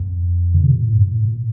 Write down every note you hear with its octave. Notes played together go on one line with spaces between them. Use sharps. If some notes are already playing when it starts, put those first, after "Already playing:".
Already playing: F2
D3
C3
A#2
A2
G2
A2
A#2